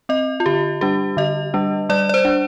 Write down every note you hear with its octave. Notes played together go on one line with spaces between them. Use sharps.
C4 D#5
F4
D3 G4
G3 D4 G4
D3 D#5
G3 D4
G3 D5
D5
C5
D4